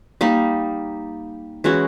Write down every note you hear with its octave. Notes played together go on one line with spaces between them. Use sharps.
G3 A#3 D#4
E3 G#3 C#4 F#4